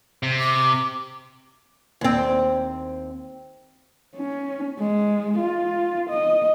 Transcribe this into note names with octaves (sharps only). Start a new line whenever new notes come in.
C3
D6
D#2 C4
C#4
G#3
F4
D#5